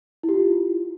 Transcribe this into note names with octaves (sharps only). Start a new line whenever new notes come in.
E4
G4
F4